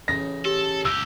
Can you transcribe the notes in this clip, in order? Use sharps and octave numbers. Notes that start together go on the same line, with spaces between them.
A1 C#3 A#6
G4 A4
C#2 G4 E6